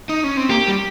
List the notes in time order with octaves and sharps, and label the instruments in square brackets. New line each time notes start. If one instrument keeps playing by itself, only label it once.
[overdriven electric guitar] D#4
C#4
C4
[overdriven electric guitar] A#3 [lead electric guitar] G4
[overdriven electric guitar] G3